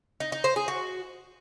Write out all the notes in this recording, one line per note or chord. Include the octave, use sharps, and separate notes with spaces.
D#4
D#4
C5
G#4
F#4